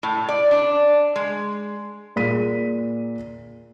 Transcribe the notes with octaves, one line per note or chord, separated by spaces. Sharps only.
A2
D5
D4
G#3
A#2 G#4 B6 D#7